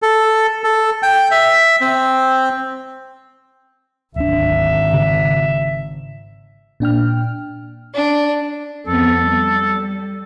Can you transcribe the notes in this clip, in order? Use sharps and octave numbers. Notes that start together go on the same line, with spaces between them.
A4
A4
G5
E5
C4
D1 G#1 D4 E5
C#3
A#2 D4 G5 F6
D4
F2 B3 A4
G3